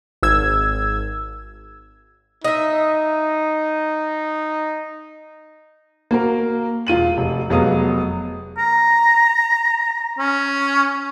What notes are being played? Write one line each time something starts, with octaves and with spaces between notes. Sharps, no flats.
G#1 E6 G#6
D#4 D#5 E5
A#3 F#4 A#4
E1 F4 D#7 F#7
F1
F1 F#3 G#3 B3 F5 D#6
A#5
C#4